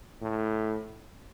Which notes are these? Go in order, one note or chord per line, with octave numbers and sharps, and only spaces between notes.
A2